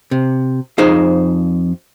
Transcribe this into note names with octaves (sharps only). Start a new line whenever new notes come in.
C3
F2 D#4 G#4 C5 F5